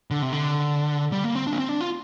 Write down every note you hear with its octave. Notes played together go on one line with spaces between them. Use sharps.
D3
C3
D3
G3
A#3
C4
D4
A#3
C4
D4
F4